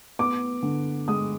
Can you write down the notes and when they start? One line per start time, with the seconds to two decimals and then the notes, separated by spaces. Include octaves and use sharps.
0.19 B3 D6
0.63 D3
1.08 G#3 D#6